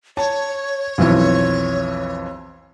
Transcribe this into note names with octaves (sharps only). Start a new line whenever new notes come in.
C#5 A5
B1 F2 E3